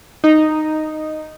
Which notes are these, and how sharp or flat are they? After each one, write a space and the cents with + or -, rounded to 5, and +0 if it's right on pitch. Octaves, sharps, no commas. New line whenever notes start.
D#4 -5